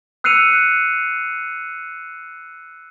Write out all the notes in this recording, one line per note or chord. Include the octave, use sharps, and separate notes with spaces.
E6 F#6 C7 C#7 D#7 F7